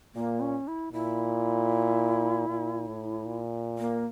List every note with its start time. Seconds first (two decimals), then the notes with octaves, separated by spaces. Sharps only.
0.15 A#2 A#3
0.41 C#4
0.68 E4
0.93 A#2 E4
2.48 A#2
2.87 A2
3.27 A#2
3.78 A#3